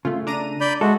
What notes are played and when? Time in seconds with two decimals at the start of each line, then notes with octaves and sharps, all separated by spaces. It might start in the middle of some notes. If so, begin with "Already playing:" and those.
0.05 C#3 A3 F4
0.27 D4 A#5 D#7
0.61 D5 B5 G6
0.81 G#3 F#4 A4 E5